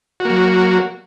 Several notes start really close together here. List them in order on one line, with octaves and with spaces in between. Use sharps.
F#4 A#3 F#3